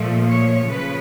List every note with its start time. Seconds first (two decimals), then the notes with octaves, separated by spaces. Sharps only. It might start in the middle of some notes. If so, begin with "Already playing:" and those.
Already playing: A#2 F3 A3
0.28 C#5
0.68 C#3 F3 B4